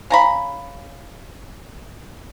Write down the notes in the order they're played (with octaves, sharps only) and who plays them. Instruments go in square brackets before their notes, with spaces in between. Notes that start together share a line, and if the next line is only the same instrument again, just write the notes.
[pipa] C#3 A#5 B5